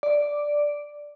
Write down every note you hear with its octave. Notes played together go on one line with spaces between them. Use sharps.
D5